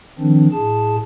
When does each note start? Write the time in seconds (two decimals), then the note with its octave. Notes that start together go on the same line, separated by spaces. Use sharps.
0.18 D#3 F3 C4 D4
0.52 A2 G#4 A5